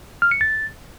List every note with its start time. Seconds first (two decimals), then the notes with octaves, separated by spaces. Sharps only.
0.22 F6
0.31 C#7
0.41 A6